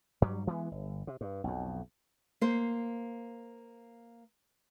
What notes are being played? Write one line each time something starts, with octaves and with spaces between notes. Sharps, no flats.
G2 F#3 G3
E3 G#3 A#3 B3
G1
C3
G2
B1 F2
A#3 C5